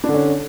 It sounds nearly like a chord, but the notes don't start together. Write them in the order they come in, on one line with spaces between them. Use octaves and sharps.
D4 D3 C#4